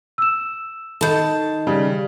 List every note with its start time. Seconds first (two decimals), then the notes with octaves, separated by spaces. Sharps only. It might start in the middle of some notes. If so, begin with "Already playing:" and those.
0.18 E6 E7
1.01 D#3 A4 A5 B5 G6
1.67 C#3 G3